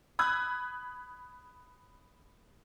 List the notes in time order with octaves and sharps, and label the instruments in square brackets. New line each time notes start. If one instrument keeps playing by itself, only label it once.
[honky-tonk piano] B5 D#6 F#6 G#6